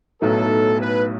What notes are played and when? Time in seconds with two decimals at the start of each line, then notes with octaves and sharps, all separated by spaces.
0.22 B1 A2 F#3 B3 D#4 A4
0.80 B4